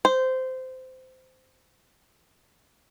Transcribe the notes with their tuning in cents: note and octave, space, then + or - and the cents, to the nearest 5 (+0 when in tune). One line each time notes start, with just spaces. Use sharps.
C5 -15